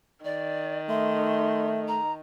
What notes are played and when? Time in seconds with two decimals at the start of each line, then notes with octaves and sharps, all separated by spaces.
0.24 D#3 D5
0.89 A3 E5 C6
1.88 A#5